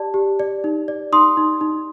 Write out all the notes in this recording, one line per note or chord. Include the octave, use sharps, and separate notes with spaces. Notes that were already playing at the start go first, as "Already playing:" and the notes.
Already playing: G4 D5 A5
G4
D5
D#4
D5
D#4 C6 D#6
D#4
D#4